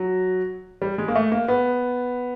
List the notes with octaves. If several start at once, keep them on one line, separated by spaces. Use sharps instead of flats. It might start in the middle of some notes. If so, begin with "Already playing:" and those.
Already playing: F#3
G3
G#3
A#3
A3
A#3
B3